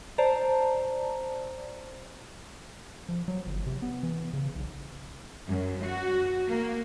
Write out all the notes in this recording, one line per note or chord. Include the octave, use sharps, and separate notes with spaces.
C5 D5 A5 A#5
F3
F#3
G1
C3
B3
E3
C#3
B1
F#2
F#4
A#3